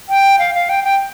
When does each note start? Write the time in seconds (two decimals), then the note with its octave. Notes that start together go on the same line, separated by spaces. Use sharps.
0.09 G5
0.39 F5
0.55 F5
0.69 G5
0.84 G5